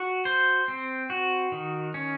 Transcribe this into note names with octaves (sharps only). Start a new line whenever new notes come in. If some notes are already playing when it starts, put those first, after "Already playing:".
Already playing: F#4
C5
C4
F#4
D#3
C#4